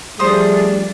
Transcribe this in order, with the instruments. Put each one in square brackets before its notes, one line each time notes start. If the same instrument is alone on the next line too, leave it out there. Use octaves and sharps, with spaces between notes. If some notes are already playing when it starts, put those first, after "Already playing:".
[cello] F3 D4 [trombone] G3 [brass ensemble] A3 G#4 [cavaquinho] C5 D#6